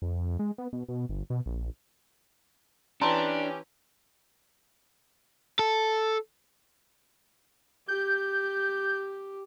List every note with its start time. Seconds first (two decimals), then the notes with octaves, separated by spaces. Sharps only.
0.02 F2
0.39 G#3
0.58 B3
0.73 B2
0.88 B2
1.09 G1
1.30 B2
1.46 A#1
3.01 E3 C#4 D4 G4 A5 A#5 C6
5.59 A4
7.88 G4 G6